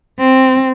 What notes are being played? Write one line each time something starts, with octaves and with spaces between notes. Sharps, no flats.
C4